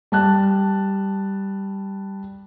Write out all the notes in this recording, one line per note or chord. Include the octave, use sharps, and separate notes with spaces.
G3 A5 F#6